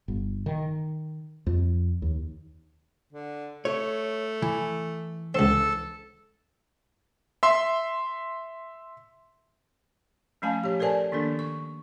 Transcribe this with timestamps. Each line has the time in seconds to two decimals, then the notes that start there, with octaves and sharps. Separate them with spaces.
0.08 G1
0.46 D#3
1.47 F2
2.02 D#2
3.12 D3
3.65 A3 C#5
4.42 E3
5.35 C#2 C4 A4
7.43 E5 C6
10.42 F3 A3 C#4 F5 G#5 A5
10.64 G4 C#5
10.80 A4 A#4 C5 D5 G#5 A5
11.12 D#3 A#3 D4 A4
11.39 C#6